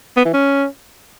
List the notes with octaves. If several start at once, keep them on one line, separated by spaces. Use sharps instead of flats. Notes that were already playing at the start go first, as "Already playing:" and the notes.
B3
E3
C#4